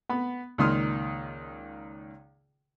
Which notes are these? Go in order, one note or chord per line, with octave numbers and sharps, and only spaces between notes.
B3 B5
C#2 A#2 D#3 C6 D#6 F6